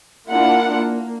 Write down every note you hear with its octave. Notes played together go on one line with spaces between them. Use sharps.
A#3 D4 E4 F4 A#4 F#5
A#3